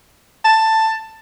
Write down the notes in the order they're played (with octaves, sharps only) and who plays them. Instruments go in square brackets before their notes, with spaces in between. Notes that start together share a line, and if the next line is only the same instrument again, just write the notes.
[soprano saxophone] A5